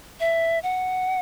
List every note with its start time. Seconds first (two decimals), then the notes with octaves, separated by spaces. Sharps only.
0.20 E5
0.63 F#5